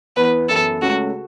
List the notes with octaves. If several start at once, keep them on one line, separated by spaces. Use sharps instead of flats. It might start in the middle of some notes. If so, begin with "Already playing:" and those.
E2 E3 B3 B4
F#2 E3 B3 E4 A4
C#2 C#3 A3 C#4 F#4